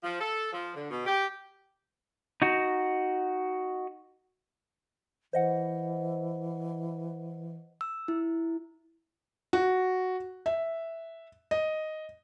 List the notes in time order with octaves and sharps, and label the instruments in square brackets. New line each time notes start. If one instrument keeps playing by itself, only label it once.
[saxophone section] F3
A4
F3
D3
B2
G4
[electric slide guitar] D#4 F#4
[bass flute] E3 [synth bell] C5 D#5 F#5
[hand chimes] E6
E4
[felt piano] F#4
E5
D#5